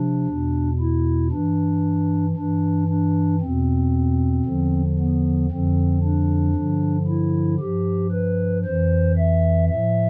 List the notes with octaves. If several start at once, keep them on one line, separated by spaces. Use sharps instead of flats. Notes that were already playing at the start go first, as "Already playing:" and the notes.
Already playing: C3 F3 D4
E2 B2
E4
G2 E3 D4
G2 E3 D4
D4
E2 B2 C4
E2 D3 F3
B3
F2 D3 F3 C4
D4
G2 D3 F3
E4
G2 F3 G4
B4
F2 E3 C5
E5
A2 F3 E5